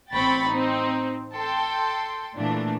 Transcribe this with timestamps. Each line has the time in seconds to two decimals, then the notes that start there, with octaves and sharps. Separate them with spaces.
0.13 A1 C4 G5 B5 C#6 A6
0.50 C4 D#4
1.37 A4 G5 C6
2.35 A#2 E3 A3 D4